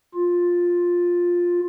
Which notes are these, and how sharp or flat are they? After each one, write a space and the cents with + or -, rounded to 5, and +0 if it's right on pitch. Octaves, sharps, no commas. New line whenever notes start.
F4 +10